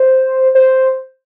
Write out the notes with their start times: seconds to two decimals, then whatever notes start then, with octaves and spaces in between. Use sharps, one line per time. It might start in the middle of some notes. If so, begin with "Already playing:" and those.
Already playing: C5
0.55 C5